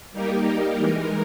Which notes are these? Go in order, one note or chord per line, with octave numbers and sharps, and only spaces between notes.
G3 A#3 D#4 G4 A#4
E3 G#3 D#4 A#4